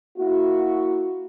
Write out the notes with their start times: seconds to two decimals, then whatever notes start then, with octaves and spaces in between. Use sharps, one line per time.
0.18 A#3 E4 F#4